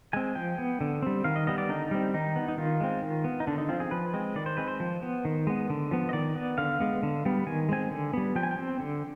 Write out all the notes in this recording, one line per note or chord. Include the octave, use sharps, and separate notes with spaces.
G#3 C4 G#5
F3 G5
B3
D3
G3 C4
D#3 F5
D#5
G3 B3 D#5
D5
D3 D#4
G3 C4
D#3 D#4
B3
D#4
D#3 F4
G#3 C4
D#3
B3
D#4
D3 D4
D#4
F3 C4 F4
G#4
F3 B4
G#3 C4
D#3 D5
C5
G#3 C4 B4
C5
F3
B3
D#3
G#3 B3
D3
F3 B3
D#5
D#3 D5
B3
D3 F5
G#3 B3
D3
G3 B3
D#3 G#5
G#3 C4 G#5
D3
G3 B3
F3 G5
G#5
G5
C4
D3